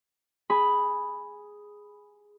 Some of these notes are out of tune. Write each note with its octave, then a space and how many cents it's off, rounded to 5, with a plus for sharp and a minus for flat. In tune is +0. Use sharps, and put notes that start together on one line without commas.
G#4 +0 B5 +0